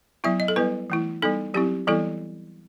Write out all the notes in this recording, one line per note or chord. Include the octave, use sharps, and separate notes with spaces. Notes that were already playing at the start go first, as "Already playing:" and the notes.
F#3 B3 E4 E5
D#5
A4
G3 B3 E4 B4
E3 A3 E4
G3 B3 D#4 A4
F#3 C4 E4 G4
E3 G3 B3 E4 A4